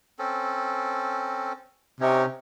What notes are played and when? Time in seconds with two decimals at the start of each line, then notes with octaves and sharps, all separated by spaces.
0.19 C4 C#4 A4
2.00 C3 C#4 D#4 C#5